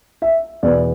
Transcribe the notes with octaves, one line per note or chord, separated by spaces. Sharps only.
E5
E2 B2 B3 D5